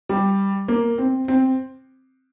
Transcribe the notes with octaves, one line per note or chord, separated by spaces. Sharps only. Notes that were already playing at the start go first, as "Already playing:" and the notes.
G3
A#3
C4
C4